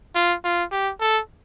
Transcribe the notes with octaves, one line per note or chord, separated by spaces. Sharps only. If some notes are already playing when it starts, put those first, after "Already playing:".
F4
F4
G4
A4